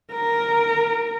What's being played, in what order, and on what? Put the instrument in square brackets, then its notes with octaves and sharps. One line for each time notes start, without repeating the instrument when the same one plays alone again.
[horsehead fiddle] A#4